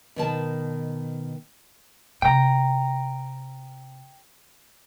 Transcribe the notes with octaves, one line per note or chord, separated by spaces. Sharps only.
B2 D#3 A5
C3 G5 A#5